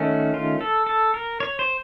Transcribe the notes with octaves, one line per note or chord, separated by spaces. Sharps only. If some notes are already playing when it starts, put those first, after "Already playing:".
Already playing: D#3 A3 C#4 F#4
F4
A4
A4
A#4
C#5
C5